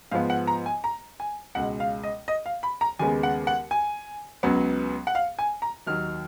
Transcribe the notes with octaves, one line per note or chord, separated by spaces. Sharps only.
G#2 F3 B3 F5
F#5
A#5
G#5
A#5
G#5
C#2 B2 G#3 F#5
F5
D#5
D#5
F5
B5
A#5
D#2 C#3 G#3 B3 G#5
F#5
F#5
G#5
C#2 C#3 F#3 B3
F#5
F5
G#5
A#5
D#2 D#3 F#3 F6